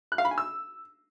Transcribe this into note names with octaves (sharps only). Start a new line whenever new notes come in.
F#6
F5
B5
G#5
E6